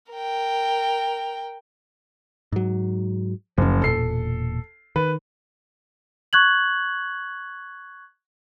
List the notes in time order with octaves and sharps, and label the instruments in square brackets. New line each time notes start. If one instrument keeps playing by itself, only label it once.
[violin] A#4 G5
[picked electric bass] G#2 F#3
[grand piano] F#1 [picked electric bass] F3 C#4
[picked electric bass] E1 A#2 [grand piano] A4 C7
[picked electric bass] D#3 [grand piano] B4
[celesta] C#6 F#6 G#6 F#7